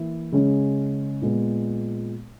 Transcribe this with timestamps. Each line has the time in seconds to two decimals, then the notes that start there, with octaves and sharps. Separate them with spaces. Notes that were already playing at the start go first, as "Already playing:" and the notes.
Already playing: E3 A#3 E4
0.32 C#3 G#3 C#4
1.22 A#2 G#3 B3